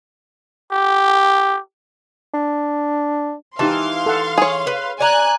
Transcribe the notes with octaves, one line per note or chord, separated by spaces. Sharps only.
G4
D4
E3 D#4 G4 F5 A5 C6
A4 F#5
G#4 C#5
B4
D5 G#5 A#5 F#6